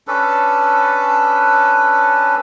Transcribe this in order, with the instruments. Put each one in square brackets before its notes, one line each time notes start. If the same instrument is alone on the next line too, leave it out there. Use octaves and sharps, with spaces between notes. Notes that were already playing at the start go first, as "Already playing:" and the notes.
[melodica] C#4 D4 A4 B4